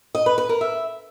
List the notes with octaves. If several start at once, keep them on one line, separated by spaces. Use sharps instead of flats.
D#5
B4
B4
A#4
E5